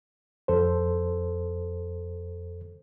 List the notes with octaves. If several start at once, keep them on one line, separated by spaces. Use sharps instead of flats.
F2 A4 C5